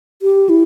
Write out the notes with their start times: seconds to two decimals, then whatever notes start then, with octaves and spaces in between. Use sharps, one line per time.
0.22 G4
0.49 E4